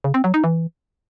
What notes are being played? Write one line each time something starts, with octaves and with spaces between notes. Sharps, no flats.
C#3
C4
F#3
D#4
E3